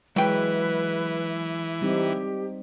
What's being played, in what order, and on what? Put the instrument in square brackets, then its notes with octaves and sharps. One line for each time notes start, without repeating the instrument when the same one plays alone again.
[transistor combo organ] E3 [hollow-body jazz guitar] F#3 G5 [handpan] G#3 [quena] B4
[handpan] G3 C4 D#4 [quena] G4